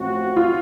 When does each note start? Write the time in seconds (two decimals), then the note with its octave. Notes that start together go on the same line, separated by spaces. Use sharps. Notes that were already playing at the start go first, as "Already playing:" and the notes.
Already playing: A1 A2 F3 C4 F#4
0.37 F4